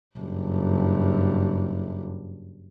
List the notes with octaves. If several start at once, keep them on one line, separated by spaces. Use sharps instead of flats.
F#1 G2